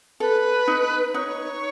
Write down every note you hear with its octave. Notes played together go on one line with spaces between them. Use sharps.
A4 B4
D#4
D#4 C#5